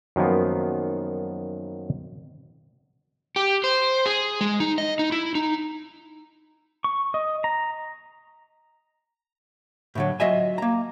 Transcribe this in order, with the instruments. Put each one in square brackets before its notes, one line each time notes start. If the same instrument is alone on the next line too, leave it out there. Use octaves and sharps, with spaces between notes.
[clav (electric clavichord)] F#2 D#3 F3 A#3 B3
[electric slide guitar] G4
C5
G#4
G#3
D#4
D#5
D#4
E4
D#4
[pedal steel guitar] C#6
D#5
A#5
[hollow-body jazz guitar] A2 D3 F#3
F#3 F4 D#5 E5 G#5
A#3 A#5